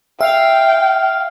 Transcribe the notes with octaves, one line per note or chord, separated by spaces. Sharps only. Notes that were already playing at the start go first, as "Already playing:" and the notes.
E5 F5 G5